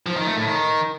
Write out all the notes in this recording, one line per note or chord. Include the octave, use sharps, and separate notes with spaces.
F3
D#3
A3
A2
D#3